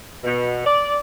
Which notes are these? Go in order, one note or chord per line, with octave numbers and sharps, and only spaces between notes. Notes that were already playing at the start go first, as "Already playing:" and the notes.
B2
D5